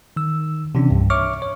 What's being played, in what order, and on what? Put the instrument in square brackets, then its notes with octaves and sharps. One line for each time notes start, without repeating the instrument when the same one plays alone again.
[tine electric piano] D#3 E6
C3 E3 C#4 D4
C2 G2
C#5 E5 C#6 D6 F6
C#5